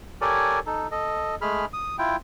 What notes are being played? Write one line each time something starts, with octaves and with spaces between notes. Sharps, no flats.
G4 A4 A#4 C#5 D5 G#5
D#4 A4
A4 D#5
G#3 A3 G#4 B5 F6
D#6
E4 F4 G5